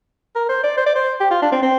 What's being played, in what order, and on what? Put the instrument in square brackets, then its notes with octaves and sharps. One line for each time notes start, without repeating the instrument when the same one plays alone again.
[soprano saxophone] A#4
C5
D5
C5
D5
C5
G4
F4
D4
C4
C4